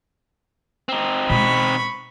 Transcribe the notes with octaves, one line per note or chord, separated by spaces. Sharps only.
C4 D#4
B2 G#3 B5 C#6